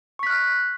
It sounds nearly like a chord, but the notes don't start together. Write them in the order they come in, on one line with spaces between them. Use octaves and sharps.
C#6 B6 F#6 F6